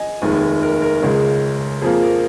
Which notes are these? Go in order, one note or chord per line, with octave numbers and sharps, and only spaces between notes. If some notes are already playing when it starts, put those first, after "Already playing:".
Already playing: D#5 G#5
F1 D#2 D#3 G#3
A#4
A#4
C#2 C#3 G#3
F2 F3 A#3 G#4
A#4